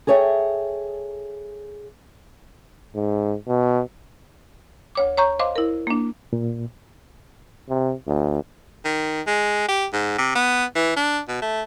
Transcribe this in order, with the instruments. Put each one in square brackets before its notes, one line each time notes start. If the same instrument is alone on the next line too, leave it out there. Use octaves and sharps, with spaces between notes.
[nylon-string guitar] G#4 A4 C#5 E5 G5
[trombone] G#2
B2
[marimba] D2 C#5 D6
C#5 A#5 C#6 G6
C5 D#5 F5 C6 D6
E4 A#4
A#3 D4
[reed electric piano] A#2
[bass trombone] C3
D2
[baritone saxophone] D#3
G#3
G4
G#2
C3
B3
E3
D4
B2
A3